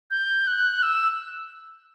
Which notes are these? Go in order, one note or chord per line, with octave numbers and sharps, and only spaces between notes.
G6
F#6
E6